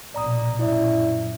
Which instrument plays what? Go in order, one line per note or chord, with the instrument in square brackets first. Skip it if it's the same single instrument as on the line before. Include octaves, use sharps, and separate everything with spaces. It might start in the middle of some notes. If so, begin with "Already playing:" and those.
[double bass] A#1 B2 [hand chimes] D5 A#5 D#6
[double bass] A#1 F#2 [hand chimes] E4 D5 E5